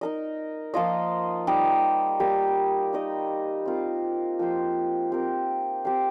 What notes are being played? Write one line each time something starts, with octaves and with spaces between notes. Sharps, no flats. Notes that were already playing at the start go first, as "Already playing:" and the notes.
D#4 A#4 D#5
F3 A#3 F4 D#5
G3 D#4 G4
G3 A#3 G4 A#4
D#4 A#4 D#5
C4 F4 A#4
F3 A#3 G4 C5
C4 G4 A#4
C4 G4 A#4 F5